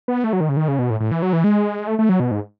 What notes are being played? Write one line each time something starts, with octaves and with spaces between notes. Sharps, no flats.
B3
A3
F#3
D#3
C#3
D#3
C#3
B2
A2
A2
E3
F#3
E3
G#3
A3
A3
F#3
B2
G#2